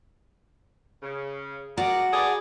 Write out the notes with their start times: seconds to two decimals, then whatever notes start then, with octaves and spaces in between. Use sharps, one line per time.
1.03 C#3
1.78 G#3 F#4 A#4 D5
2.13 G#4 A4 B4 D5